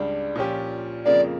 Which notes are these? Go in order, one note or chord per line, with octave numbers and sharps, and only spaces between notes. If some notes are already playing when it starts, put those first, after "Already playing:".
Already playing: C#2 C#3 G3 D4
A#2 F3 C#4 G4
F2 C#3 F3 A#3 D5